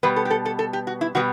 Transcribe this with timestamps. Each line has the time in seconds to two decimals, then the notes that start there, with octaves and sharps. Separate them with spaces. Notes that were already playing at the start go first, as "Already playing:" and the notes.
0.03 B2 G3 B3 B4
0.16 A4
0.25 G4
0.30 A4
0.45 A4
0.59 A4
0.73 G4
0.87 F#4
1.01 E4
1.15 B2 G3 B3 F#4